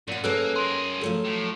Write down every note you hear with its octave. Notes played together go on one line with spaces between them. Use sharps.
F#2 A#2 F#5
F#2 F#3 G#3 A#3 A4 B4
G#4 A#4 C6
F3 F#3 A3
A2